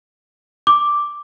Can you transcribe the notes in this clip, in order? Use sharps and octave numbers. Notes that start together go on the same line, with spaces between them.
D6